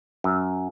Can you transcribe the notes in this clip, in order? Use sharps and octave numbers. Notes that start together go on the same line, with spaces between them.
F#2